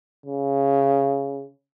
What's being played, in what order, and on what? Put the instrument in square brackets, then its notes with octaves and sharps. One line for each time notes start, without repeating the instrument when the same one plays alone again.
[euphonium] C#3